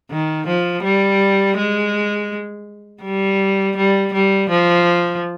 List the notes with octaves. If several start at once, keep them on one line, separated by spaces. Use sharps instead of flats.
D#3
F3
G3
G#3
G3
G3
G3
F3